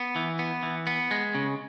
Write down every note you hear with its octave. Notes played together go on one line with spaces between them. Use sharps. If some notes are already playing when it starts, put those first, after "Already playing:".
Already playing: B3
E3
B3
E3
B3
G#3
C#3